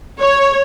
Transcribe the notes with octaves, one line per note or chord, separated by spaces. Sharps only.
C#5